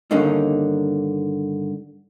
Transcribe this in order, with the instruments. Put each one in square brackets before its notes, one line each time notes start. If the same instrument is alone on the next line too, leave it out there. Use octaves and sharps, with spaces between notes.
[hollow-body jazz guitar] G2 D3 D#3 A#3 C#4 D#4